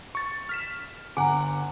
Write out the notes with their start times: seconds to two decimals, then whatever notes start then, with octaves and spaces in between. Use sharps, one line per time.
0.15 C#6 A6
0.49 F6 B6 E7
1.17 G1 F#5 G#5 A#5 D6